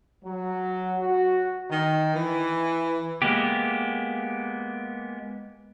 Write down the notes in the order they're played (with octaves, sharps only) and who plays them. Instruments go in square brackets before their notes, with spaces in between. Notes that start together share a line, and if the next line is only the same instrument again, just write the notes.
[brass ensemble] F#3
F#4
[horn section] D#3
E3
[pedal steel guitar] G#3 A#3 B3 G4